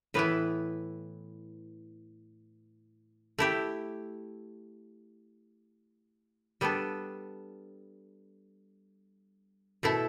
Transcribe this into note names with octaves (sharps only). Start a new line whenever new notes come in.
A2 E3 B3 E4 B4
A3 E4 G4
G3 B3 D4 A4
B2 A3 E4 A4